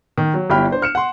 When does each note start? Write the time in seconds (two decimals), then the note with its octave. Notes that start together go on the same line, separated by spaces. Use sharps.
0.18 D#3
0.34 F#3
0.50 G1 G3 E4 G5 B5 F6
0.70 D4 C5
0.82 F6 C#7 E7
0.95 F#5 C6